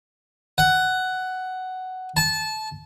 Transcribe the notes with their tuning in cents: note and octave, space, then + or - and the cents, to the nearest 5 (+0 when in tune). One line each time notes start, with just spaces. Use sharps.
F#5 +10
A5 -20